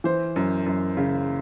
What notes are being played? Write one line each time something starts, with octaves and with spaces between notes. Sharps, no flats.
E3 C5
F#2
F#2
C#3